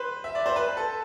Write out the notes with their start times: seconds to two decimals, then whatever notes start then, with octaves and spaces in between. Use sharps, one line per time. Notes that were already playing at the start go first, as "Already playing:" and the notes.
Already playing: B4 C5
0.24 E5
0.35 D5
0.46 C5
0.56 B4
0.77 A4